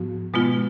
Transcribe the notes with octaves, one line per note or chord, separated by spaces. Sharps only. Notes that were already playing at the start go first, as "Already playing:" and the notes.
Already playing: G#2 F3 B3 F#4
B2 G#3 B3 F4